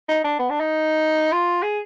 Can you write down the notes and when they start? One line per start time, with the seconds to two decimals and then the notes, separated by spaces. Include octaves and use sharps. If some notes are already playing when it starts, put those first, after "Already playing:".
0.09 D#4
0.24 D4
0.39 B3
0.50 D4
0.60 D#4
1.32 F4
1.63 G#4